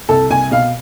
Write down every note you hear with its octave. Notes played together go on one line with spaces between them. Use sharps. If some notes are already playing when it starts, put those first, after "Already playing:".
C2 A4
C2 G#5
B2 F5